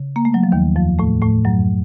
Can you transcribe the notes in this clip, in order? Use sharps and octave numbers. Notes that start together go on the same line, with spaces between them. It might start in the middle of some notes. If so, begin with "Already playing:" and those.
Already playing: C#3
A#3
A3
F#3
F3
D#2 D#3
F2 F3
A2 A3
A2 A3
F#2 F#3